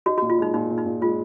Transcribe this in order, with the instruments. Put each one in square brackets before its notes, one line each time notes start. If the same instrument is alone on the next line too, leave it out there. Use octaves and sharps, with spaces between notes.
[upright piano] D#4 [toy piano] F#4
[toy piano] F#4
[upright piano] A#2
[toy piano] F4
[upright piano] G#3 [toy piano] D#4
[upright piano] A#2 [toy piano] D#4
[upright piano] A#2
[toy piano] D#4
[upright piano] A#2
[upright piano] G#3 [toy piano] F4